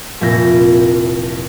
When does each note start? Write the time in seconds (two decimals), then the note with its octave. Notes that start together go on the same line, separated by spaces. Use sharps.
0.21 F1 A#2 E4 G6 A#6